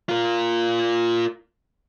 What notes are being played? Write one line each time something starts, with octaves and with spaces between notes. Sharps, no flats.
F4 A#4